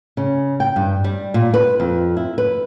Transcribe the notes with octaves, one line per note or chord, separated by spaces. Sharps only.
C#3
G5
G2
G3
A#2
B4
F2
E4
B4